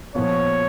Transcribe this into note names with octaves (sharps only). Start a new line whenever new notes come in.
A#2 F3 B3 C#5